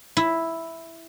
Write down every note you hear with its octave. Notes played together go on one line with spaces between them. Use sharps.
E4